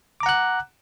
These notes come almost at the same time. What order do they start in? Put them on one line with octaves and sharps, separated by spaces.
D6 A#5 F#5 F#6